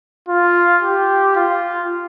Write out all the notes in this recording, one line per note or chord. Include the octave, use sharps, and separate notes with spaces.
F4
G4
F4